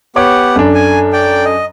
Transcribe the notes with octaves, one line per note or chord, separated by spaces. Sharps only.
B3 G4 C#5 F#5 D6
F#2 D4 A4
G#5
D5 G5
D#5